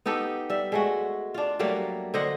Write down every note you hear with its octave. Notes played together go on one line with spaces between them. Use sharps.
B3 D#4 G4 A4
G3 E5
G#3 A3 F#4
D4 F4
F#3 G3 A3 A#3
D3 C5 D#5 F#5